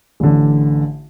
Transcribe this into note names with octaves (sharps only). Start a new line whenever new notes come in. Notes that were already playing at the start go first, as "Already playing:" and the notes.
A1 D3